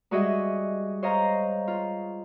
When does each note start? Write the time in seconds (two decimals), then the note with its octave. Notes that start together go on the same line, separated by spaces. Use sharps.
0.11 G3 G#3 F#4 G#4 D#5 E5
1.03 C5 C#5 D#5 F5 A#5
1.68 F4